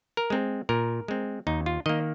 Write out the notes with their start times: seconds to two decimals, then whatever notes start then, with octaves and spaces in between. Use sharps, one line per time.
0.17 A#4
0.30 G#3 C4
0.69 A#2 A#4
1.08 G#3 C4
1.47 D#2 D#4
1.66 F4
1.86 D#3 A#3 D#5